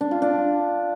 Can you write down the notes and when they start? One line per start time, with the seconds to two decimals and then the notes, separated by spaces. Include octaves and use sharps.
0.01 D4
0.11 F4
0.22 D4